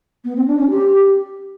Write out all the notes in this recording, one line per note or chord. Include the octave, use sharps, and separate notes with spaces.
B3
C4
D4
C#4
G4